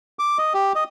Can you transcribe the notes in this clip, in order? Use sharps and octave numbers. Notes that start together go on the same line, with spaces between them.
D6
D#5
G4
D#5